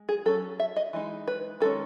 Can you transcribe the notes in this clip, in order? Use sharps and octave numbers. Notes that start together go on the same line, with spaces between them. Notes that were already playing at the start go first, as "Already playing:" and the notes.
Already playing: G#3
G#4
F#3 C#4 A4
E5
D#5
E3 G#3 D#4
B4
D#3 G#3 C#4 A4